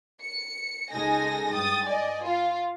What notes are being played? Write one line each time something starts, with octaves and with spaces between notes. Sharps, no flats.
C#7
C#2 G#3 D#4 A4 G#5 A#6
G2 G5 D#6 A6
D5 D#5 G#5
F4 F5